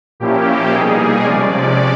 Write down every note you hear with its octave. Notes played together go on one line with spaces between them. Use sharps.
A#2 F3 A#3 C#4 E4 G4
B2 G3 A#3 D#4 G#4
C3 F3 G#3 C#4 D5